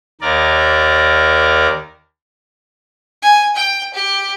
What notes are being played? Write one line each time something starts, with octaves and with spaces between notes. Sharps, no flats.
D#2 A#4 D5
G#5
G5
G4